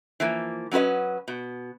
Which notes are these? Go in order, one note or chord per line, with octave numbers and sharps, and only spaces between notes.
E3 F3 A#3
F#3 C#4 F#4 B4 D#5
B2